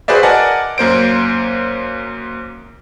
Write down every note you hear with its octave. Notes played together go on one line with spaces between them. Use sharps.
F#4 G#4 B4 C5 D5 E5
A#4 D5 D#5 F#5 G#5 A5
F#2 A#3 C5 D7